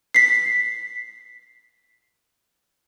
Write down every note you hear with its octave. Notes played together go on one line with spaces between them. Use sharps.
B6 C7